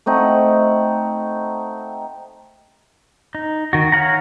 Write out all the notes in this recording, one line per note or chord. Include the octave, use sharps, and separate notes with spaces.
A3 C4 D#4 F#5
D#4
D#3 F#4
C#5 F5 F#5 A#5